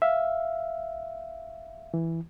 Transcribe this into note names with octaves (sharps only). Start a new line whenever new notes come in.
E5 F5
E3